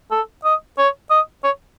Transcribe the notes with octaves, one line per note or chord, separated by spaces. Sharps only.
A4
D#5
C#5
D#5
C#5